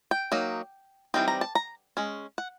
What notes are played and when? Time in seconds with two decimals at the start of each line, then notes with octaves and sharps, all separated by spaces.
0.11 G5
0.32 F#3 A#3 D#4
1.14 E3 G3 C4 D#4 G5
1.28 A#5
1.41 A5
1.55 A#5
1.97 G#3 C#4
2.38 F#5